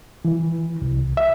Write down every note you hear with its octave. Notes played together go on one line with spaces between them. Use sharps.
E3
C2
E5